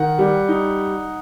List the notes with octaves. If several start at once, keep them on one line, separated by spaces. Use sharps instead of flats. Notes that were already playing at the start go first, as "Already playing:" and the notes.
Already playing: D#3 F#5
G3
D#4